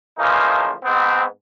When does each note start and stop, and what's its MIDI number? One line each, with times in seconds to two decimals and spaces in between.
0.18 0.71 33
0.18 0.71 49
0.18 0.71 52
0.18 0.71 53
0.18 0.71 58
0.18 0.71 63
0.84 1.23 44
0.84 1.23 59
0.84 1.23 60